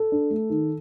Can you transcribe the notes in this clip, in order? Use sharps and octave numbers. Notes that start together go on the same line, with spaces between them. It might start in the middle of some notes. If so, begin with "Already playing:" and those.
Already playing: A4
D4
A3
D#3